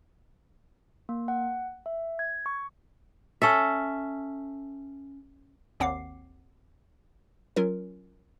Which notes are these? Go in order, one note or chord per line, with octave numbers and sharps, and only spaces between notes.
A#3
F#5
E5
G#6
C#6
C#4 A4 E5
G#1 D#2 C4 F#5 D6 C7
F#3 C#4 F4 A#4